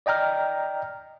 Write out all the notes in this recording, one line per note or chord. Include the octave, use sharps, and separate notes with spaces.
D5 D#5 G5 A#5 F6